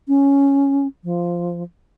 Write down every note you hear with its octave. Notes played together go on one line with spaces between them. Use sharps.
C#4
F3